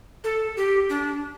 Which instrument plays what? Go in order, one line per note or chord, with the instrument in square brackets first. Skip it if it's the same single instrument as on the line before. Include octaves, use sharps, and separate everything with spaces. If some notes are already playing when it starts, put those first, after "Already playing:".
[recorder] A4
G4
D4